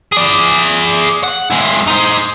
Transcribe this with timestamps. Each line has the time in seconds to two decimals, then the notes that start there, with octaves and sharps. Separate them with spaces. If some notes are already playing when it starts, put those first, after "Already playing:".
0.12 G#4 D5
1.23 F#5
1.51 G#3 E4
1.87 D#4 C5